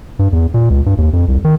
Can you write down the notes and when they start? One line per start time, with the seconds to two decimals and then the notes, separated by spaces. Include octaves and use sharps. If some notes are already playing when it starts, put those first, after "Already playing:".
0.19 G2
0.33 E2
0.54 A#2
0.70 C#2
0.86 G2
0.98 D#2
1.13 F2
1.28 C2
1.44 D#3